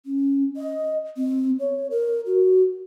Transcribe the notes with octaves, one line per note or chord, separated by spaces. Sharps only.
C#4
D#5
C4
C#5
A#4
F#4